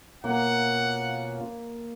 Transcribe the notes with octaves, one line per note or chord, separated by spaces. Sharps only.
B2 A#3 C#4 F4 F#5